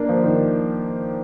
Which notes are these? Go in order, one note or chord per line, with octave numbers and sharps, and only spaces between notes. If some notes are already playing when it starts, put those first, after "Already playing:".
Already playing: A#3 D4
F3
D#3